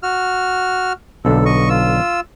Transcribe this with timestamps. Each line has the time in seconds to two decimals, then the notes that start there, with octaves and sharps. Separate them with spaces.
0.03 F#4 F6
1.25 B1 D3 A4
1.46 D#5 C#6
1.69 F4 E6